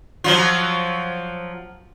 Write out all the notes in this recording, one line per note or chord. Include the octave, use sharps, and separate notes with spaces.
F3 F#3 F4